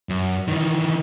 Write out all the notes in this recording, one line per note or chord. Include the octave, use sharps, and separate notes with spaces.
F#2
D#3 E3